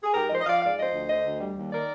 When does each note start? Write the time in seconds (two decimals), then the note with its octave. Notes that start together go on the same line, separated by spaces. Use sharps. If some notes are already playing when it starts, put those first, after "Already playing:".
0.04 G#4
0.14 G#2 G4 A#4
0.30 F3 C5 D#5
0.41 D#5
0.46 F3 D5 F5
0.62 G#2 D5 F5
0.77 F3 C5 D#5
0.94 D2
1.09 D3 C5 D#5
1.25 D2
1.41 G3
1.57 D#2
1.72 D#3 A#4 D5